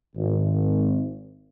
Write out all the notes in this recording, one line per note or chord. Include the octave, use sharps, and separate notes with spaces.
G#1